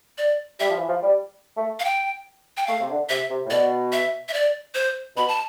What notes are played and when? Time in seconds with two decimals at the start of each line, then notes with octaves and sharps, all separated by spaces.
0.18 D5
0.59 G3 E5
0.69 F3
0.78 E3
0.88 F3
1.02 G3
1.57 A3
1.80 F5
1.85 G5
2.57 G5
2.67 A3 F5
2.80 C3
2.89 D3
3.09 C3 E5
3.30 C3
3.45 A2
3.50 B2 D5
3.92 E5
4.29 E5
4.33 D5
4.75 C5
5.16 B2 B5
5.28 A5